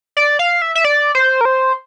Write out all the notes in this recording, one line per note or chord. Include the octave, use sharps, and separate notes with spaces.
D5
F5
E5
E5
D5
C5
A#4
C5